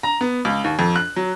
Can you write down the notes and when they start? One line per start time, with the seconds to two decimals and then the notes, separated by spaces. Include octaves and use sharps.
0.03 A#5
0.21 B3
0.45 C#2
0.64 D#2
0.79 F2
0.96 F#6
1.16 F#3